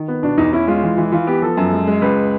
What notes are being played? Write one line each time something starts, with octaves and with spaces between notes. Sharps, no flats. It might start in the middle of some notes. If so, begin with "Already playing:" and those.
Already playing: D#3
B3
B2 D4
E2 D#4
C#4 E4
G#3 F4
E3
E3
E3 F4
B3 G4
F3 A4
F#2
G#3
G#3
C#2 B4